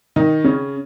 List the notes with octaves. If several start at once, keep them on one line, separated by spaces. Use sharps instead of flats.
D#3 D#4
C#3 C#4